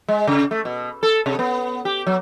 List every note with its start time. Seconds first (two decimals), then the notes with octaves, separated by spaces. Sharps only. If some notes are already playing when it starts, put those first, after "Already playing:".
0.08 G#3
0.27 C#3
0.51 A3
0.65 B2
1.03 A4
1.26 C3
1.39 B3
1.85 G4
2.07 F#3